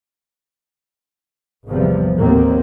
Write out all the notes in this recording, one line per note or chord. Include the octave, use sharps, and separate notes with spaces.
G#1 E2 C3 E3 F3 G3
D#2 A2 F#3 A#3 C4